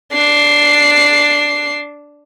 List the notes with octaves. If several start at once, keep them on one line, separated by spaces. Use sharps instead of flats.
D4 C7